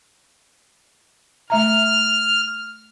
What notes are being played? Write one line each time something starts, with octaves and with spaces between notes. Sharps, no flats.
A3 E5 A#5 F6